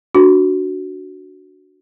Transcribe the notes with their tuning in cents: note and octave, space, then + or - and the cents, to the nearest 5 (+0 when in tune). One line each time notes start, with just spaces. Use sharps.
D4 +0 F#4 +0